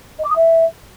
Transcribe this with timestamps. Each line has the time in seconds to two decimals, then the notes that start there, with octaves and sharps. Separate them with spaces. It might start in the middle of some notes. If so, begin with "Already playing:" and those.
0.19 D#5
0.24 D6
0.30 D#6
0.35 E5